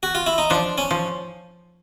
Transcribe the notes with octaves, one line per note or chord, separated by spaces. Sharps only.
F#4
F4
E4
D#4
F3 D4
C#4
F3